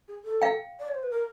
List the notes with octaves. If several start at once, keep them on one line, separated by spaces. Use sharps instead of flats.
G#4
A4
F5 G5
D5
C#5
C5
B4
A#4